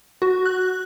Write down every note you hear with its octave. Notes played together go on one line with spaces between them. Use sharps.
F#4
F#6